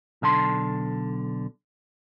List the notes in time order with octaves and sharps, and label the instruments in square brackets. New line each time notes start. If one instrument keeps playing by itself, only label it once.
[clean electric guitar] B1 D3 A5 C6